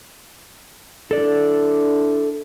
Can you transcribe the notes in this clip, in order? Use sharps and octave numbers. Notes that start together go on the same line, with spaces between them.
D4 E4 A4 D5